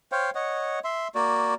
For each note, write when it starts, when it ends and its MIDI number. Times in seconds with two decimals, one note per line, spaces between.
0.12 0.30 72
0.12 0.30 73
0.12 0.30 77
0.12 0.30 79
0.35 0.79 73
0.35 0.79 75
0.35 0.79 78
0.84 1.08 76
0.84 1.08 84
1.15 1.54 58
1.15 1.54 66
1.15 1.54 74